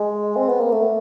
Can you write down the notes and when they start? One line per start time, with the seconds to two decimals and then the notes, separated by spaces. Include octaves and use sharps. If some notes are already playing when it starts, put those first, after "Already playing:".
Already playing: G#3
0.36 C4
0.49 B3
0.61 A#3
0.72 A3